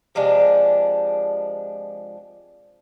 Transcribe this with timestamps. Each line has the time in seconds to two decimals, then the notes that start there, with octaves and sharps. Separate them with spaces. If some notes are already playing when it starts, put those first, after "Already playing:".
0.15 C3 F3 G#3 D4